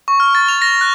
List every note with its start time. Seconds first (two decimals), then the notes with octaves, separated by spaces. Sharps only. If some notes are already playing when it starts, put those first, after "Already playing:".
0.08 C#6
0.20 F6
0.35 A6
0.48 F7
0.62 A#6
0.81 F#6